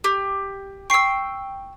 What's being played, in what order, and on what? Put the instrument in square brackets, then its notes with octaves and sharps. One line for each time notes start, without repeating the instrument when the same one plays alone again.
[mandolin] G4
[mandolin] G5 E6 [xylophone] C#6 C7